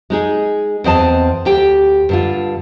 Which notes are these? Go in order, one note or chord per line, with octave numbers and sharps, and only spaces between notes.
G#3 D#4 G#4
E2 C4 D#5 A5
D2 G4 G5
G2 D3 F4